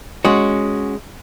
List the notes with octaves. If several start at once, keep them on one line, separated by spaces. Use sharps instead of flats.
G#3 C#4 F#4